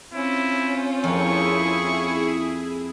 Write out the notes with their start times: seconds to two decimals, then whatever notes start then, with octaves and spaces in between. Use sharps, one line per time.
0.14 C4 C#4 E4 F4
1.04 F2 A#3 E4 G#4 C#6